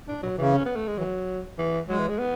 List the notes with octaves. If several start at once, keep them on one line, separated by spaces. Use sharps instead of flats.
A2 D4
B2 F#3
C#3 E3
C#4
B3
A3
G#3
E3 F#3
E3
F#3 G#3
E3
G#3
B3